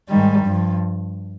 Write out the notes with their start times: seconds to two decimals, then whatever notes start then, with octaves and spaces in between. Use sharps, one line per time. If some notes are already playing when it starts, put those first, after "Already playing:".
0.09 G#2 D#3 G3
0.44 G2 F3